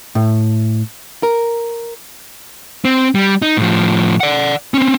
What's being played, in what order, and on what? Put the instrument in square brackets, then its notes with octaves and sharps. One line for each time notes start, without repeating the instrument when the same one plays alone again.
[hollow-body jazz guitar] A2
A#4
[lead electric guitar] C4
G3
D#4
A2 F3
D5 F#5
C4 C#4